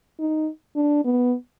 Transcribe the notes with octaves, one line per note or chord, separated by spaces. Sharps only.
D#4
D4
B3